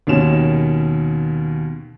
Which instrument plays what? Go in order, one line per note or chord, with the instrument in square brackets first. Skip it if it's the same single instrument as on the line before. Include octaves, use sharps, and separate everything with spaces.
[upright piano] D#2 B2 D#3 C#4 E7